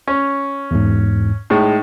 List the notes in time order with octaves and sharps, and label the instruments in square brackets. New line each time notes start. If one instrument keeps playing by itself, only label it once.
[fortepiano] C#4
[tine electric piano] E2 G#2
[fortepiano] A2 G#3 [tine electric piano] D#4